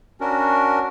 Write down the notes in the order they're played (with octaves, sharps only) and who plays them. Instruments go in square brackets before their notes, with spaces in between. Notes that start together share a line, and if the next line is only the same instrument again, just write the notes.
[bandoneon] C#4 D4 F#4 A#4